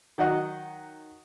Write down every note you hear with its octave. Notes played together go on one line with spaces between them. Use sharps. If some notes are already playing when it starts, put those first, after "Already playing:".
D#3 F#3 F#4 D#5 F#5